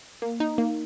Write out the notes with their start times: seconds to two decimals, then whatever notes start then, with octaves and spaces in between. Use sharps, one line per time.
0.22 A#3
0.40 D#4
0.58 A#3